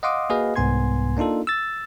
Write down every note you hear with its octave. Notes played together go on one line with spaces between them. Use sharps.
D#5 F5 F#5 C6 D6 D#6
A#3 F#4 G#4 B4 D#5 F5
C2 G#2 B3 G#5 C6 G#6
A#3 D4 D#4 F4 A4
E6 A6